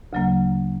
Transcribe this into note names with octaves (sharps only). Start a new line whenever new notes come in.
D2 C#3 F#3 A#3